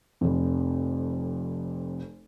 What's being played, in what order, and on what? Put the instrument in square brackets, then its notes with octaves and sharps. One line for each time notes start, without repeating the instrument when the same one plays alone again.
[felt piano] F1 F2